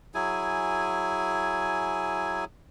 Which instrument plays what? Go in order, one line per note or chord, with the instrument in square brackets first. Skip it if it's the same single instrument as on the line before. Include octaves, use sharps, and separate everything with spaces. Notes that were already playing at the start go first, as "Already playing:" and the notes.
[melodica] F#3 E4 G#4 G#5